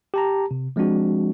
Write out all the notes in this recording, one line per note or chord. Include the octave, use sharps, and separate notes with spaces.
G4 A5 A#5
C3
F3 G#3 C4 D4 F#4